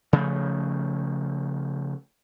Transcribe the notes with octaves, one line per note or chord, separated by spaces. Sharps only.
C#3 F3 A3